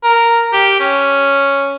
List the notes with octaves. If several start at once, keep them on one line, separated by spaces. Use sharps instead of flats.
A#4
G4
C#4